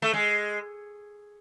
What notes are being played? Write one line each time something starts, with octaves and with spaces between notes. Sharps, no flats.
A3
G#3